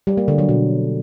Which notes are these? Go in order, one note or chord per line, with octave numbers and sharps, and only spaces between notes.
G3
A#3
D3
F#3
B2